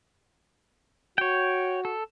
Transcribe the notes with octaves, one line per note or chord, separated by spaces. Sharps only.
F#4 C#5 G5
A4